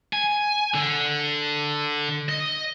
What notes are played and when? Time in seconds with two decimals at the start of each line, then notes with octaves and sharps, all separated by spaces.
0.13 G#5
0.74 D3
2.29 D#5